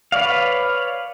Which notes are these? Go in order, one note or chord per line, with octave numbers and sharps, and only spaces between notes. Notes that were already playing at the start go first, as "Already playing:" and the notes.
B4 C#5 D5 F5